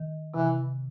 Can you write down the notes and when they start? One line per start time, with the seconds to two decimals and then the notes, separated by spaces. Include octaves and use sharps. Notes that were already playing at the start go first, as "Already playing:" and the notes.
Already playing: D#3
0.34 C3 E3